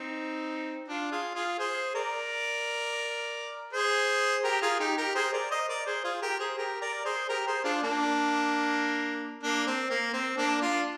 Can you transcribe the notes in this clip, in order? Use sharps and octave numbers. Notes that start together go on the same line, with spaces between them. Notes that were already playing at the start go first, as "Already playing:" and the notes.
Already playing: C4 D#4
D4 F4
F4 G#4
F4 G#4
G#4 C5
A#4 D5
G#4 C5
G4 A#4
F4 G#4
D#4 G4
G4 A#4
G#4 C5
A#4 D5
C5 D#5
A#4 D5
G#4 C5
F4 G#4
G4 A#4
G#4 C5
G4 A#4
A#4 D5
G#4 C5
G4 A#4
G#4 C5
D4 F4
A#3 D4
A#3 D4
C4
A#3
C4
A#3 D4
D4 F4